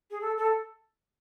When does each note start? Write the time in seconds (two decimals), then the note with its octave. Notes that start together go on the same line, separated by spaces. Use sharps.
0.11 G#4
0.21 A4
0.37 A4